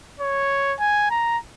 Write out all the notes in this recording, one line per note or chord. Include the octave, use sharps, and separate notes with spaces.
C#5
G#5
A#5